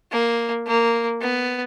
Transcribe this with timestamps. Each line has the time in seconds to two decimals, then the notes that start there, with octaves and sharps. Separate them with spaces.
0.12 A#3
0.67 A#3
1.21 B3